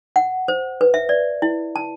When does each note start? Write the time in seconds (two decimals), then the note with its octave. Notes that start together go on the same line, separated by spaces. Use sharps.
0.16 F#5
0.48 C5
0.81 B4
0.94 E5
1.09 D5
1.42 E4
1.76 A5